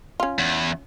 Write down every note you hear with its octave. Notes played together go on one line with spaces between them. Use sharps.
C#4 F4
E2